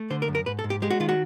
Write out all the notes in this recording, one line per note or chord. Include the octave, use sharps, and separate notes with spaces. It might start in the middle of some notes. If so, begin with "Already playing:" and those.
Already playing: A3
D3 C5
A#4
F#2
A#4
G#2 B4
A4
G#2
G4
G#3 G4
F#4
D#3 F4
F#4